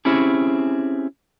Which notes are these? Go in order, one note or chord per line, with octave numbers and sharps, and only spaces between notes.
C4 C#4 E4 G4 G#4